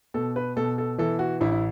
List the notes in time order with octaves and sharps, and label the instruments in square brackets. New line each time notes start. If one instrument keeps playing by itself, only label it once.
[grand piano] B2 [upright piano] A4
[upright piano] B4
[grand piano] B2 [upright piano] A4
[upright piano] A4
[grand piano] E3 [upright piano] A4
[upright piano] F#4
[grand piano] A1 [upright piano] E4
[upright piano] E4